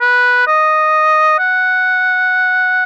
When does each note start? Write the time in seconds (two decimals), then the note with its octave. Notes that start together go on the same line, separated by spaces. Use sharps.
0.01 B4
0.47 D#5
1.39 F#5